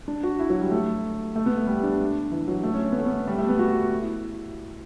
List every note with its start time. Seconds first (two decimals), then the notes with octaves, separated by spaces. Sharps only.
0.08 D4
0.23 F#4
0.39 E4
0.50 F#3
0.61 G3
0.71 A3
1.36 A3
1.46 B3
1.57 A3
1.67 G3
1.84 D4
2.31 E3
2.48 F#3
2.63 A3
2.74 C#4
2.84 C#4
2.92 B3
2.99 A3
3.06 B3
3.27 G3
3.38 A3
3.49 B3
3.59 F#4
4.02 E4